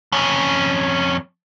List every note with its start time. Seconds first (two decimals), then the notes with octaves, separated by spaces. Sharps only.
0.12 F2 C#4